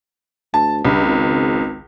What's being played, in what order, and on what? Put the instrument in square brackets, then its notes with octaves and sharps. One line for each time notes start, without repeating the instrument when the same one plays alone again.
[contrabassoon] D2 [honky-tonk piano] A5
[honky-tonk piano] C#2 [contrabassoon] G2
[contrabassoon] G#1